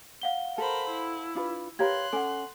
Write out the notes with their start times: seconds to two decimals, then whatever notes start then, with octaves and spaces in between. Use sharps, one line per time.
0.22 F5 F#5 G7
0.58 A4 A#4 C5 B5
0.91 E4
1.35 D4 F4 B4
1.79 G4 A#4 B4 C#5 F5 C6 F#6 G#6
2.13 C#4 A4 F#5 G#5